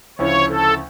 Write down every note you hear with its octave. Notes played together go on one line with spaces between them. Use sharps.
D2 C#3 F3 C#4 E4 C#5
A4